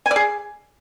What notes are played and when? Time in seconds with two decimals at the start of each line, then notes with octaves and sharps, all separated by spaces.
0.06 G#5
0.11 D5
0.16 G#4